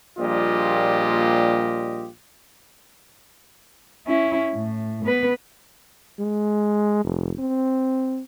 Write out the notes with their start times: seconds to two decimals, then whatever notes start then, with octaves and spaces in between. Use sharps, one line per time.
0.19 A#1 A#2 G3 F4 G4 D#5
4.07 C#4 E4
4.54 A2
5.05 B3 B4
6.20 G#3
7.04 F1
7.39 C4